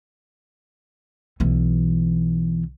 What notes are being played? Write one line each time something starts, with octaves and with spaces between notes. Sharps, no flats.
B1 E3